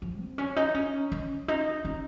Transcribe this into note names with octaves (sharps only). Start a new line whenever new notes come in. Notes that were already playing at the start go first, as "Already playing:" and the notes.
F3
C4
C#4
D#4
C#4
C#4
D#4
C#4